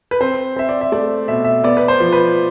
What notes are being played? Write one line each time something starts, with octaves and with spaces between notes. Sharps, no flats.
B4
C4 C5
C4 E5
D5
E5
A3 D5
B2 E5
E5
B3 D5
B4
C5
F3
B4